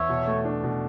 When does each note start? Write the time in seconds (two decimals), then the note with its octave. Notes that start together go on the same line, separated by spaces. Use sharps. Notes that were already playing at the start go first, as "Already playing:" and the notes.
Already playing: E2 C#5 E5
0.09 B2
0.27 A3
0.45 D4
0.63 B2